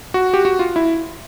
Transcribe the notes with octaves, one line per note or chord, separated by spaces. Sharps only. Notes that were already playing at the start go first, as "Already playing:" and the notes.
F#4
G4
F#4
F4
E4